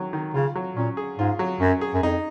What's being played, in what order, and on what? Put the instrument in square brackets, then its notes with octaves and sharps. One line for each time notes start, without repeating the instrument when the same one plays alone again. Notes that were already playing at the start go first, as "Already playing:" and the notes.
Already playing: [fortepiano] D#3 F#3
D#3
[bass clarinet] C#3 [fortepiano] F4
[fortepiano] F#3
[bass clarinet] A#2 [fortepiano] C#4
[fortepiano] G#4
[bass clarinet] G#2 [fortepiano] F4
[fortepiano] F#3
[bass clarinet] F#2 [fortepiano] C#4
[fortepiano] G#4
[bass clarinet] F#2
[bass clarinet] F2 [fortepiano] D#4